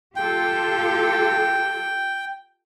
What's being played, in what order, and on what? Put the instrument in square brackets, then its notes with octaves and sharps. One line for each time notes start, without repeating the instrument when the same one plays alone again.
[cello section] F4 G4 A4 [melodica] G5